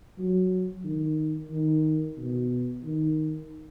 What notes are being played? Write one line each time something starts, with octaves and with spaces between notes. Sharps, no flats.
F#3
D#3
D#3
B2
D#3